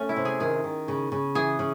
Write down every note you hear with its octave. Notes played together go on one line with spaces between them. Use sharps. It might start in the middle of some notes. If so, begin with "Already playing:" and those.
Already playing: A3 C#4
E4
C3
G#4
D#3 G#4
D#3
C#3
C#3
E3 G#4
C#3